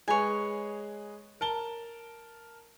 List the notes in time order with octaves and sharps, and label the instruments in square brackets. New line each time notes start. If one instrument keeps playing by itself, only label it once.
[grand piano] G#3 G#4 B4 [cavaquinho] C#5 G#5
[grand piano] A#4 A5 G7